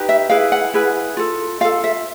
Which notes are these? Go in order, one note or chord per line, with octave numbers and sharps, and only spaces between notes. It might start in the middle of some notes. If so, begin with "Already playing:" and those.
Already playing: D#4 G4 B4
E5
E4 G#4 B4 F5
F#5
E4 G#4 B4
F4 A4
F4 A4 F5
E5